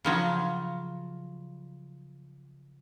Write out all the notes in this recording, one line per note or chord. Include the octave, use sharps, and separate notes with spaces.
C#3 F3 F#3